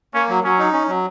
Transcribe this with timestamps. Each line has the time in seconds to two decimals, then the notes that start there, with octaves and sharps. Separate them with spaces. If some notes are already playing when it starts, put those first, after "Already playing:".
0.14 A#3 C#4
0.29 F#3
0.44 F#3 C#4
0.59 D#4
0.73 C#4
0.88 F#3